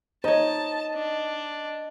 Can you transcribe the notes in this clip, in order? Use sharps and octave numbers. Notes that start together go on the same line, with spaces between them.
D#4 C#5 D#5 A5
D4